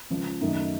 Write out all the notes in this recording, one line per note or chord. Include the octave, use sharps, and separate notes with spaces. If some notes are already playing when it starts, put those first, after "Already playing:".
C#2 C#3 F3
F#2 D#3 A3 D#4